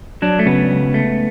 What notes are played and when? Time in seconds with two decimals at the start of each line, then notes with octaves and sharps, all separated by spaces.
0.22 F#3 D4
0.39 A3
0.46 C#3 B3
0.70 C#2
0.94 A3